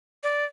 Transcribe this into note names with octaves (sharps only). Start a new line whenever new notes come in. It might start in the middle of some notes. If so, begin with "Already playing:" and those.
D5